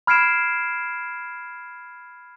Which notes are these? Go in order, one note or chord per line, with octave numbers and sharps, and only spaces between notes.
B5 F6 G#6 C7 D7 E7